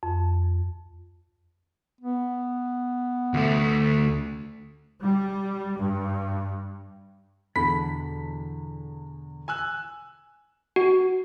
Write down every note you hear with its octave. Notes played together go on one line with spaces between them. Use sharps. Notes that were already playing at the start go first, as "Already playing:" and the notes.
F2
B3
D2 A3
G3
G2
E2 B2 D3 A4 B5 B6
G#5 E6 F#6
F#4